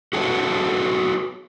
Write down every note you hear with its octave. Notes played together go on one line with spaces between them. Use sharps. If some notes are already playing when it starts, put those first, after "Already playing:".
F#4 G#4 A4 B4 C#5